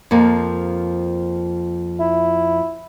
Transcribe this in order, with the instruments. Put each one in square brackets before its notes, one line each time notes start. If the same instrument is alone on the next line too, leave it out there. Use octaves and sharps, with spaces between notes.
[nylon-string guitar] F2 F3 A#3
[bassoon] E4